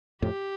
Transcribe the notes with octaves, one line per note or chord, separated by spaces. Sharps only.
F2 A2 G4